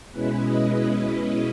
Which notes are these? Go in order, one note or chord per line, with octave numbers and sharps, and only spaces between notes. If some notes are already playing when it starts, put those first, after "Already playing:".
B2 G#3 C#4 E4 B4
D#5
D#5